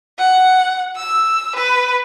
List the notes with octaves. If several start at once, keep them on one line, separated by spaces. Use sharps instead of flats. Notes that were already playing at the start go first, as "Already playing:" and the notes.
F#5
E6
B4